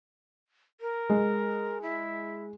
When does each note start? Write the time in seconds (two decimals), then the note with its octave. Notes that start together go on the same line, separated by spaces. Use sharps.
0.81 A#4
1.09 G#3
1.82 E4